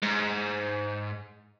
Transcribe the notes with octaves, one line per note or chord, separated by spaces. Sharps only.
G#2